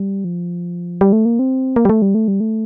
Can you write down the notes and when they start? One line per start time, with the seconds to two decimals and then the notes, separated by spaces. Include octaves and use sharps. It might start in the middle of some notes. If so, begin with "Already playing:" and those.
Already playing: G3
0.25 F3
1.01 G3
1.13 A3
1.25 A#3
1.39 C4
1.76 A#3
1.85 G3
1.90 A3
2.02 G3
2.15 A3
2.28 G3
2.40 A3